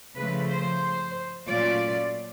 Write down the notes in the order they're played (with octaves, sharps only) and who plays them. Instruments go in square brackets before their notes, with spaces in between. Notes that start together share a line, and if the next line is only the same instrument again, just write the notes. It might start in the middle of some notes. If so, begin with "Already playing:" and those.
[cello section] C#3 F3 A3 B4
C5
A#2 F#3 A3 C#4 F4 D5